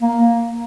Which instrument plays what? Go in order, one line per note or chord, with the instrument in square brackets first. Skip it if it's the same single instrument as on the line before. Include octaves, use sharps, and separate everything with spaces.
[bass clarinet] A#3